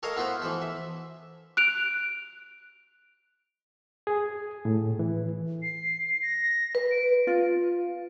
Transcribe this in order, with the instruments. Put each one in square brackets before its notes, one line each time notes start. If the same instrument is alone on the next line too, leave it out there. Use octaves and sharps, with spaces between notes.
[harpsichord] A4 A#4 C#5 D#5 F5 A#5
B3 E4 F4 B4 C5
E3 F3 A4
E5
[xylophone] F#6 D7 F7
[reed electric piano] G#4
A2
E3
[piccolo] C7
A#6
[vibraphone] B4
[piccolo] D7
[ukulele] F4